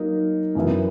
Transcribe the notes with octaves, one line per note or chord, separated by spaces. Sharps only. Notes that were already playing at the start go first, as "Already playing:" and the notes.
Already playing: F#3 A#3 D#4 A#4
F#2 E3 B3 E4 A#4